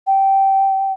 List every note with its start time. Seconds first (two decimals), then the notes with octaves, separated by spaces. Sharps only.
0.07 G5